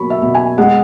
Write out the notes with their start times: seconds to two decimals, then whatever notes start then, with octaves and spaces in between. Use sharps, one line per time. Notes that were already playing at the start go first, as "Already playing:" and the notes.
Already playing: B2 F#3 A#3 B5 C#6
0.10 E5
0.22 B2
0.34 G#5
0.58 G#3 F#5